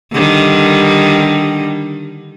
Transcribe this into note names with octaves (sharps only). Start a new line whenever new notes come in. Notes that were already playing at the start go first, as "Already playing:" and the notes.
D3 D#3 G3